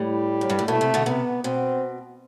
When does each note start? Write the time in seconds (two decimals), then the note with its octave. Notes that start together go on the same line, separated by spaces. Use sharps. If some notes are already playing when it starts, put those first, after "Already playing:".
Already playing: A2 G3
0.41 F#2
0.50 G2
0.59 A2
0.68 B2 A3
0.81 C3
0.94 B2 D3
1.06 C3 B3
1.44 B2 C4